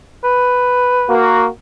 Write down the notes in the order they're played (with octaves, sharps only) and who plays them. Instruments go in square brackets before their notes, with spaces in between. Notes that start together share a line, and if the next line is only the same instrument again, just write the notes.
[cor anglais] B4
[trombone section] A#3 F#4